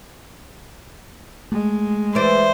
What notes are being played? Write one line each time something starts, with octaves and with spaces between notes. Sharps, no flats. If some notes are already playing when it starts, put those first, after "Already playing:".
G#3 A3
E3 B4 C5 D5